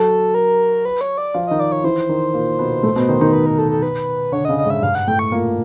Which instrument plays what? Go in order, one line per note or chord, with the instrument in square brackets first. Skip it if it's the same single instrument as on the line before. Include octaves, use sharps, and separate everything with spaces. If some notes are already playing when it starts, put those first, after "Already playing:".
Already playing: [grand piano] F#3 F#4 [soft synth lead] A4
[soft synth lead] A#4
B4
C#5
D5
[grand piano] F3 F4
[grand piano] D#3 D#4 [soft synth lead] D#5
[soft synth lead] D5
C#5
[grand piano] E3 E4 [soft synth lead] C5
[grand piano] D#3 D#4
A#2 A#3
B2 B3
A2 A3
B2 B3
D#3 D#4
D#3 D#4
[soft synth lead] B4
A#4
A4
A4
B4
[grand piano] D3 D4 [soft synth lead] C#5
[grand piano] C#3 C#4 [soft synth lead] D#5
[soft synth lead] D#5
[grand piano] G#2 G#3
[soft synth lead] E5
[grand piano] G2 G3 [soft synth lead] F5
[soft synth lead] F#5
[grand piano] A2 A3 [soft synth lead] G5
[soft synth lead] C#6
[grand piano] A#2 A#3